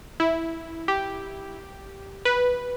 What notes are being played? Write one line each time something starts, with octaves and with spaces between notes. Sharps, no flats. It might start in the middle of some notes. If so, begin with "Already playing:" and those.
E4
G4
B4